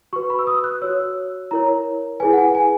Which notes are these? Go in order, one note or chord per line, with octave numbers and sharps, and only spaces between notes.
F#4 B4 C#6
B5
E6
D#6
F#6
F#4 C#5 E6
E4 A#4 C#5 A#5
E4 G#4 B4 G#5
F#5
G#5
G#5